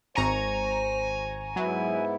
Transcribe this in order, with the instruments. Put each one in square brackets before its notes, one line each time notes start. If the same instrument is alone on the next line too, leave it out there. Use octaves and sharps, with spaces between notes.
[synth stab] G#1 A#5 C#6 [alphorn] C5 [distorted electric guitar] G#5
[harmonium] G#2 B3 E4 [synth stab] F#3